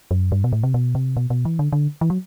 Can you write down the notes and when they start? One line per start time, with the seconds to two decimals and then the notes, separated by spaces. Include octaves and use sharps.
0.11 F#2
0.32 G2
0.44 B2
0.52 A2
0.63 C3
0.74 B2
0.95 C3
1.17 B2
1.30 B2
1.45 E3
1.59 D3
1.72 D3
2.01 E3
2.10 F#3